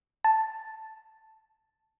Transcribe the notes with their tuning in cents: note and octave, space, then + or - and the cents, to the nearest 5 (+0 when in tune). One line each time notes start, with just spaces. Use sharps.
A5 +0